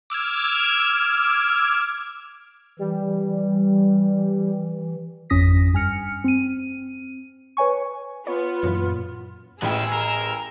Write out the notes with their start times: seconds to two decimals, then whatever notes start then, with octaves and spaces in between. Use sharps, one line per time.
0.10 D6 E6 F6 G#6
2.79 E3 G3
5.30 G#1 F2 C#4 D#6 A#6 B6
5.73 G2 G#5 F6 C#7
6.24 C4 D#7
7.57 B4 C#5 G#5 C#6
8.27 B3 F4 C#5
8.63 F#2 A#2 E3
9.62 A1 B3 C#4 E4 G#4 G5 E6
9.93 A#4